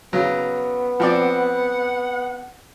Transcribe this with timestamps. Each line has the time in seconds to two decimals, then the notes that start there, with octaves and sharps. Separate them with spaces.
0.13 C#3 F#3 B3
1.00 F3 C4 D5 F#5